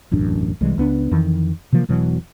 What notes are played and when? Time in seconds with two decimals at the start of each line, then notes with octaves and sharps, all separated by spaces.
0.11 E1 A1 F#2 D4
0.61 C2 E3 G3 G#3
0.78 C#2 B3 D4
1.11 F2 D#3 E3
1.72 C3 E3 F3 A#3
1.88 E1 B2 E3 F#3